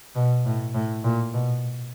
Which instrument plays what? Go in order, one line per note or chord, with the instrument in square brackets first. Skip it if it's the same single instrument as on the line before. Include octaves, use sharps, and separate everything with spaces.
[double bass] B2
A2
A2
A#2
B2